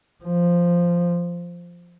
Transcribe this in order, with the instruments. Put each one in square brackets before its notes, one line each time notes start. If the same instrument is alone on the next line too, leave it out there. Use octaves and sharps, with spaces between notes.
[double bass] F3